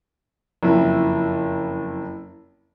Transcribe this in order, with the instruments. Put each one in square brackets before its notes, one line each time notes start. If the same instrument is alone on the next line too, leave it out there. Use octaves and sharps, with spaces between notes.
[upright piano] F#1 F2 E4